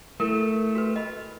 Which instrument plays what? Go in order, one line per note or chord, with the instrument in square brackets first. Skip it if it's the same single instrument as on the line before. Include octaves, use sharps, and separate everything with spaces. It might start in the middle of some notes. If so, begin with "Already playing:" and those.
[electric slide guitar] A3 [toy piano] E4 A#4
[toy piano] F#4 B4
D#5 B5